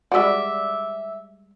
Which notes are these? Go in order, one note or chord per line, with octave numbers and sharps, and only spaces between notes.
G3 G#3 F#4 D5 E5